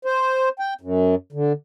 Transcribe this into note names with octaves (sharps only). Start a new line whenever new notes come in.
C5
G5
F#2
D3